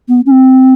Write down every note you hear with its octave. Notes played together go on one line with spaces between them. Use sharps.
B3
C#4
C4